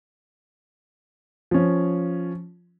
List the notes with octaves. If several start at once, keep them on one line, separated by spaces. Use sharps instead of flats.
F3 C#4